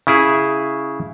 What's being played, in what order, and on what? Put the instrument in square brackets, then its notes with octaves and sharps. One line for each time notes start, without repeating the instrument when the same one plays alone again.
[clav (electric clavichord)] C#3 E4 G#4